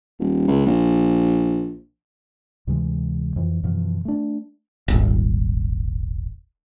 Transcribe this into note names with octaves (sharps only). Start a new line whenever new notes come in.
D#1
C#2
A#1
D2 C3 E3 G#3
F2 E3
F#2 B2 E3 F3
A3 D4
D#1 G#1